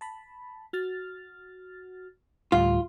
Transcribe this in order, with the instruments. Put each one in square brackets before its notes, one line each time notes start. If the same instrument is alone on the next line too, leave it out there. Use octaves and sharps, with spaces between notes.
[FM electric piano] A5 B5
F#4 F6 A6
[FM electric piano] D2 A2 G3 [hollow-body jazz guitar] F4